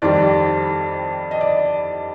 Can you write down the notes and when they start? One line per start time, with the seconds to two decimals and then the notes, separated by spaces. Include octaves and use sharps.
0.02 F2 D#3 G3 D5
1.31 D#5
1.41 D5